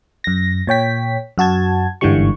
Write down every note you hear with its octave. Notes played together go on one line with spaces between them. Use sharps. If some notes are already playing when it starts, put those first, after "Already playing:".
F#2 A#6
A#2 C#5 G5 B6
F#2 F#4 A5 G#6
G1 G#2 D3 E3 G3 C#6